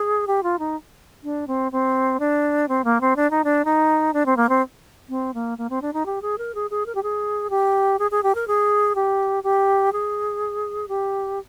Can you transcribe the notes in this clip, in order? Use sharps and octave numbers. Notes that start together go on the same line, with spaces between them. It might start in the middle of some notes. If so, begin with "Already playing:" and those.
Already playing: G#4
G4
F4
D#4
D4
C4
C4
D4
C4
A#3
C4
D4
D#4
D4
D#4
D4
C4
A#3
C4
C4
A#3
A#3
C4
D4
D#4
G4
G#4
A#4
G#4
G#4
A#4
G4
G#4
G4
G#4
G#4
G4
A#4
G#4
G4
G4
G#4
G4